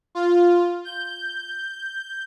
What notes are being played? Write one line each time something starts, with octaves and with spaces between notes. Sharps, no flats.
F4
G6